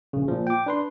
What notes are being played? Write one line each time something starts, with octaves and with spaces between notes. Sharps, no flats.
A#1 C#3
A#2 F3
G5 D6
D4 B4 C6